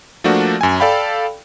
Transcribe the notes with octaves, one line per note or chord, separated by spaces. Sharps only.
F3 A3 A#3 D4 F#4
F#2 G#5
A4 D5 F5 G5 B5